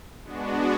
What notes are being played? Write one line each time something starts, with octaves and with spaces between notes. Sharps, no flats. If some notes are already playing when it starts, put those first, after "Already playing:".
G#3 B3 D4 F#4